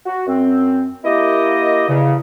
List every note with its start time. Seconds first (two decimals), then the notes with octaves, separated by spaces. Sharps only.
0.06 F#4
0.26 F#2 C4
1.04 A#3 E4 G4 D#5
1.88 E2 C#3